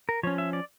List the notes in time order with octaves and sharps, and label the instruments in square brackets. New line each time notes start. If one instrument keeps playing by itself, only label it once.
[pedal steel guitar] A#4
F3 C#4 C#5
E5
D5